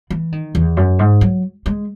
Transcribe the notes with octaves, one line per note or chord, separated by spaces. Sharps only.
E3
D#3
E2
F#2
G#2
F#3
G#3